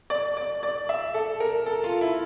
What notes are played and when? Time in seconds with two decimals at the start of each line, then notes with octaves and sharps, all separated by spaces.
0.10 D5
0.37 D5
0.63 D5
0.89 E5
1.14 A4
1.40 A#4
1.66 A4
1.84 F4
2.01 E4